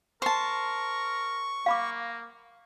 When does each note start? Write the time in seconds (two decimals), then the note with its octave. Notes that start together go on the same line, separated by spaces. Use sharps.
0.22 A#4 C5 A5 C#6
1.66 A#3 F5 B5 D6